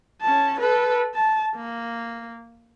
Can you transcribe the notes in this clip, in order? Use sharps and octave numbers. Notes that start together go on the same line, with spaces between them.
C#4 A5
A4 B4
A5
A#3